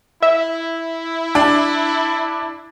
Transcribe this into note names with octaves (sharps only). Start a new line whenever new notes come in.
E4 E5
D4